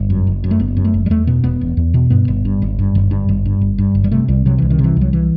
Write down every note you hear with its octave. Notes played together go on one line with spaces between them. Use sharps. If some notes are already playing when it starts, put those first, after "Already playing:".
Already playing: G1
F#2
F#1
F#2
A3
F#1 B3
F#2
A3
F#1
G3
E2 A3
B2 B3
E1 B3
E1
E2
B2
G2 B3
G1
G2
G1
G2
G1
G2
G1
G2
G1
G2
G1
G3
C3 A3
C2 G3
C3 F#3
C2 E3
D#3
C3
E3
C2 F#3
E3